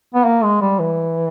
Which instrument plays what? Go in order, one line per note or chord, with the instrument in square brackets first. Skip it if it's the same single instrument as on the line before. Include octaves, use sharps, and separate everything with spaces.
[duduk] B3
A#3
G#3
G3
E3